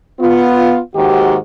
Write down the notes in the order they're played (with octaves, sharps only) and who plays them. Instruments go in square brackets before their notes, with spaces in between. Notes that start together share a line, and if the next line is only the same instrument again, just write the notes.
[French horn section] B3 F4
D#2 G#2 D#3 F#4 G4